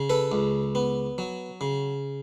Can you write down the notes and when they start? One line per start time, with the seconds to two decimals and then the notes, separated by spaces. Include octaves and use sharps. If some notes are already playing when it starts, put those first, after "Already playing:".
Already playing: C#3
0.10 A4 B4
0.32 C#2
0.75 B3
1.18 F#3
1.61 C#3